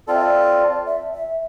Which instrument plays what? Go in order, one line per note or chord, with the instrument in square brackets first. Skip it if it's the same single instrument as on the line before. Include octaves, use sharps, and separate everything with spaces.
[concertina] C4 F4 A4 [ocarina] D5
[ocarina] E5
D5
E5
E5